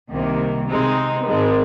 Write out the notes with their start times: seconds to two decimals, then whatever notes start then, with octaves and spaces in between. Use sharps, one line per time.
0.11 C2 C3 D#3 A#3
0.69 C3 G#3 C4 D#4
1.26 G#1 G#2 G#3